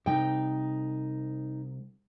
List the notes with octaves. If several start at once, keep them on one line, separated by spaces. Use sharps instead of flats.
C2 D#4 G5